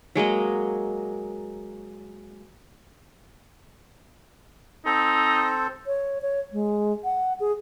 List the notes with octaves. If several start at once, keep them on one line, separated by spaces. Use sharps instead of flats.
F#3 G#3 A#3 D#5
C4 D#4 A4 C5
C#5
C#5
G#3
F#5
G#4